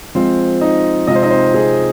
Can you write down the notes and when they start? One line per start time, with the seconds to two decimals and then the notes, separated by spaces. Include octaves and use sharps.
0.15 F3 G#3 C4 F4 C5
0.61 D#4 D#5
1.07 C3 G#3 C4 F4 D#5
1.15 C5
1.23 D#4 D#5
1.30 C4 C5
1.54 G#4